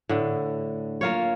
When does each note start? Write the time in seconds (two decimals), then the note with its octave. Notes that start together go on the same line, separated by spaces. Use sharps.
0.09 A2 D3
1.01 A#3 F4 C#5